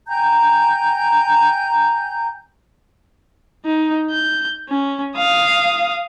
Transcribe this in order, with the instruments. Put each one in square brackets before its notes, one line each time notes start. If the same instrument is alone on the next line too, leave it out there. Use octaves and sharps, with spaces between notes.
[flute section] G5 G#5 A#5 G6
[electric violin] D#4
G6
C#4
F5 D#6